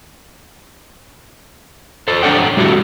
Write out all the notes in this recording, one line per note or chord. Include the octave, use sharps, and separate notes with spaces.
A4 C5
D4 A4 C#5 D5 F#5 G5
G3 E4 F#4 A4